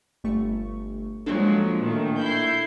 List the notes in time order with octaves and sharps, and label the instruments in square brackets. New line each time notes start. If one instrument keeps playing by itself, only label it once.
[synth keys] G1 A3 C#6
[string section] F3 F#3 G#3 [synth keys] A#3 D4 A4
[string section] A#2 D#3 A3
E4 G6 C7